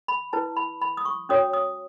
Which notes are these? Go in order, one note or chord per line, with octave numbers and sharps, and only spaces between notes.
B5
E4 B4 A5
B5
B5
D#6
C#6
C#4 F#4 C#5 D#6
D#6